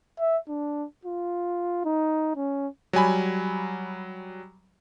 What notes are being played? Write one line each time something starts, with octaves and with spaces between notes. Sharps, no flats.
E5
D4
F4
D#4
C#4
F#3 G3 G#5 B5